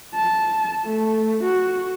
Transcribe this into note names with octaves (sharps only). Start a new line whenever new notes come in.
A5
A3
F#4